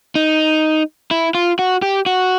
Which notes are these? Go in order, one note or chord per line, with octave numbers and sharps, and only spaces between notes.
D#4
E4
F4
F#4
G4
F#4